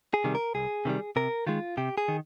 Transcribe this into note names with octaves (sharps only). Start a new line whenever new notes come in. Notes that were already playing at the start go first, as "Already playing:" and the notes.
G#4
C3 D#3 G3
A#4
C2 G#4
C3 D#3 G3
C3 A#4
D#3 G#3 F4
C3 G4
G#4
D#3